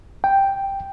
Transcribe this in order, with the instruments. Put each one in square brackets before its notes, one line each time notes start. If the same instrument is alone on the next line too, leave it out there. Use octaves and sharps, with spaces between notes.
[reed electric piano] G5